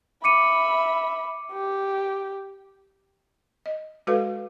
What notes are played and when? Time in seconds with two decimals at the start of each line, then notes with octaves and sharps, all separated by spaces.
0.24 E5 B5 D6 C#7 D#7
1.52 G4
3.66 D#5
4.07 G#3 F#4 A4 B4 F5